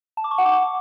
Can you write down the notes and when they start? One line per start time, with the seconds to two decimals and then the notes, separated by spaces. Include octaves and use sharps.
0.17 A5
0.24 D6
0.31 C#6
0.38 F#5
0.45 D6